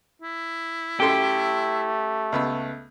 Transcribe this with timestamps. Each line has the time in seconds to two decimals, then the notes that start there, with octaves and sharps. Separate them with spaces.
0.22 E4
1.00 F#2 A3 G4 A4 C6
2.32 C#2 B3 E6